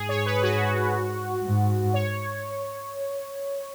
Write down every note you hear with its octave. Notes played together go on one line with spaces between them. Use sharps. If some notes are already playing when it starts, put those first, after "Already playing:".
Already playing: G#2 G#4
C#5
B4
F#4
G#2
C#5